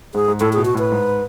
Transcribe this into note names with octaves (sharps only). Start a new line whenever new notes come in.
G#2 G#4
G#2
A2 A4
G#4
B2
F#4
A2 B4
G#2